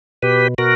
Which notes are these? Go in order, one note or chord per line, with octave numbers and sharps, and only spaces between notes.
B2 G4 B4
B2 F#4 A#4